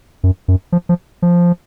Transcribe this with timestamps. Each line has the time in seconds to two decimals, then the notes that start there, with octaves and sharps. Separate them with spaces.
0.24 F#2
0.48 F#2
0.72 F3
0.89 F3
1.22 F3